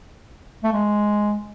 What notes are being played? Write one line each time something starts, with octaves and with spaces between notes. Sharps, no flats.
A3
G#3